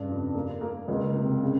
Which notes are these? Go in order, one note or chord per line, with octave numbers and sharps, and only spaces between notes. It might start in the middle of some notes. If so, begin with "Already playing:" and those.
Already playing: G2 C#3
F2
A#3
A#3
C#2
C3
C#3